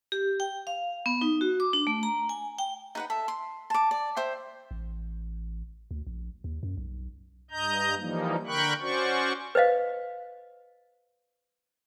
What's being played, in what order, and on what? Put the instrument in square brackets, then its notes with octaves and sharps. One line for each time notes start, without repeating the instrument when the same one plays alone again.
[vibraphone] G4
G5
F5
B3
D#4
F#4
D6
D4
A3
A#5
G#5
G5
[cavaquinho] D#4 B4 F#5
A4 E5
C6
A5 D6
D5
C5 E5 G5
[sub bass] A1
D2
A#1
D#2
F#2
B1
[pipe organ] G2 D#5 A#5 G6
E3 F3 G3 A#3 D#4
D3 A#4 G5 B5 C#6 F#6
C#4 F#4 C5 D5 C#6
[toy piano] B4 C5 D#5 F5